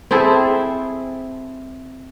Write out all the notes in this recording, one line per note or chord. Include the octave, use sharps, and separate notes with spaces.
C4 E4 G#4 A4